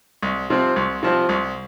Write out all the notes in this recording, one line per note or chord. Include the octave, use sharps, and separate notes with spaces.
C2
C3 F3 C4
C2
C3 F3 C4
C2